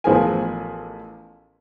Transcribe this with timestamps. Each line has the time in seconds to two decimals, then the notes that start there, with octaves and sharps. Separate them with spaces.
0.04 A1 F3 B3 G#4 A#4 G#5